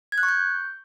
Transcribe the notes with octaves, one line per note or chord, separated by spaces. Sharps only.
G#6
F#6
C#6
G6